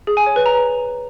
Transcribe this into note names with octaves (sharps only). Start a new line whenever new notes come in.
G#4
G#5
C#5
B4
A#5